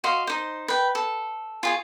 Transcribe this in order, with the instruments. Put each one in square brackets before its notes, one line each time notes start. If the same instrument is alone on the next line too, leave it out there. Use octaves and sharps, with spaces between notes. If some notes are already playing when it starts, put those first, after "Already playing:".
[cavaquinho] F#4 D#5 F5 C6
D#4 C5
B4 G5
A4
F4 G#4 C#5